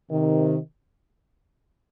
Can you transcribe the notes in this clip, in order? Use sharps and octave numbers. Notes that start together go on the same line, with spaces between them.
C3 D#3